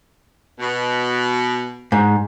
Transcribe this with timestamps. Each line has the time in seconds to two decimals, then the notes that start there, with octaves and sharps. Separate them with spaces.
0.59 B2
1.92 G#2